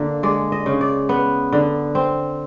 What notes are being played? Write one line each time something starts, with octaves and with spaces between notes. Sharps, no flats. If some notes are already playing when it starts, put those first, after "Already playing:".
Already playing: D3 A#3
G#3 D5
D#5
C#3
D5
B3
D3
C4